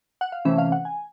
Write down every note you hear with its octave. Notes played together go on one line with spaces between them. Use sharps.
F#5
F5
C3 E3 A3 C#4 E5
F5
F#5
G#5